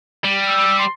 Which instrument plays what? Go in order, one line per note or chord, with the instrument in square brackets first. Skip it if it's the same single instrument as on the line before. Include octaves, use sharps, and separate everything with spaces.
[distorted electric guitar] G3
[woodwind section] E6
C6